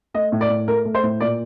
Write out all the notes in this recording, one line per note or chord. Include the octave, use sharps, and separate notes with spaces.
A3 D#5
A2
D5
A2
A3 A#4
A3
C5
A2
A#2 D5